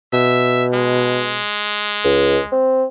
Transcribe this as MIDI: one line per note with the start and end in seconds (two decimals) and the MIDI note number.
0.13 1.43 47
0.13 0.66 76
0.73 2.60 56
2.04 2.38 37
2.52 2.85 60